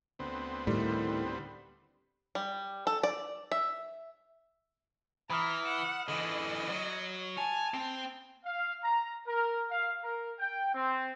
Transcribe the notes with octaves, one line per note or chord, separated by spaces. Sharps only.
D2 B3 C4
A2 D#3 G3
G3
A4
D5
E5
E3 A#5 B5 D#6 F6
F#5 E7
D3 E3 D#5 F#7
F#3
G#5 A5 F7
C4
F5
A#5
A#4
F5
A#4
G5
C4